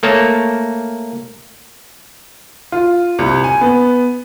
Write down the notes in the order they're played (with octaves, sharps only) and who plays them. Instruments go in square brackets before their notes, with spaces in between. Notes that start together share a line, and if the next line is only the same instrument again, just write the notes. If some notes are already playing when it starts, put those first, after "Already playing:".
[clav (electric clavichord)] A3 A#3 C#5 A5
[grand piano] F4
C2
G#5
B3